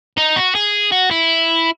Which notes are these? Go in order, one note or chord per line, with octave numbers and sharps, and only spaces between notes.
D#4
F#4
G#4
F#4
E4